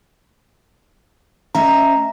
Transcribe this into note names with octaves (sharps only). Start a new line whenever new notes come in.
A3 C#4 E5 A#5